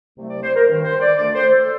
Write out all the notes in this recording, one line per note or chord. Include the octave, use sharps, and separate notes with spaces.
C2 C3 F#3 A3
D5
C5
A#4
G2 D#3 G3
C5
D5
D2 D3 A3 C4 D5
C5
A4